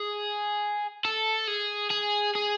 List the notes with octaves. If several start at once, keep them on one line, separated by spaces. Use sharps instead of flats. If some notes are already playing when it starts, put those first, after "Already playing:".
Already playing: G#4
A4
G#4
G#4
G#4